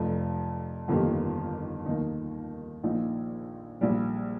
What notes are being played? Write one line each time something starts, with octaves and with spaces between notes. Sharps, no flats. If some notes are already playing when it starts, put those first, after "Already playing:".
Already playing: F1 F2 F3
G1 F2 D#3 A#3 G4
D#2 D#3 A#3 D#4
A#1 A#2 F3 D#4
A#1 A#2 G3